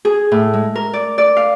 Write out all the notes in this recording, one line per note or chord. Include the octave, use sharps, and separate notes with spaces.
G#4
A2
G#3
A#4
D5
D5
F5